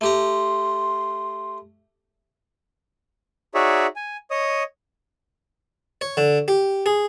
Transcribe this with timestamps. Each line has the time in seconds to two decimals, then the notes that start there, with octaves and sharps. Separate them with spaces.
0.01 A3 G4 A#5 C6
3.55 D#4 F#4 G#4 C#5 D5 E5
3.96 G#5
4.31 C#5 D#5 D#6
6.01 C#5
6.17 D3
6.48 G4
6.86 G#4